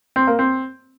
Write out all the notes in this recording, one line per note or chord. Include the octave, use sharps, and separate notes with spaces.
C4
A#3
C4